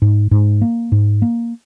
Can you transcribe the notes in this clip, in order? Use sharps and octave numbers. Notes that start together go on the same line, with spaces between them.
G#2
G#2
A#3
G#2
A#3